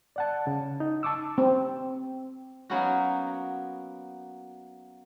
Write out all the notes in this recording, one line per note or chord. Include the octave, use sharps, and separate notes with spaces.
D5 F#5 A5
C#3
D#4
A5 C#6 D6 E6
C4
F#3 A#3 B3 C#4 D#4 F#4